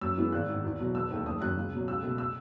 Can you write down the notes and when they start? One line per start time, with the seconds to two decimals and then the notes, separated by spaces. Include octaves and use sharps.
0.01 F#2 E6
0.17 E3 G#3 B3
0.32 G#1 F#6
0.48 G#2 D#3
0.64 E2
0.79 B2 F#3
0.95 E1 E6
1.11 D#2 D#3 A3
1.26 F#1 D#6
1.41 F#2 D#3 F#6
1.56 C#2
1.73 B2 F#3
1.88 C#2 E6
2.03 B2 A3
2.18 E6